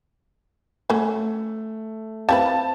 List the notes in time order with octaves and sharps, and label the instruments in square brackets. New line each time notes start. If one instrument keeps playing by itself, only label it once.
[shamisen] F#3 C#4 [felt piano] A3
[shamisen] G3 E4 B4 [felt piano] C4 [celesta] F5 [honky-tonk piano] A5